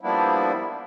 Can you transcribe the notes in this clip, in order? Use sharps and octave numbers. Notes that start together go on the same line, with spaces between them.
F3 G3 A#3 B3 D4 E4